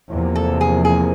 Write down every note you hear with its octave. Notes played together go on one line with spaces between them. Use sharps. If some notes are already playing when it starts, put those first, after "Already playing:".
E2 C3 F3 A#3
A4
G#4
G#4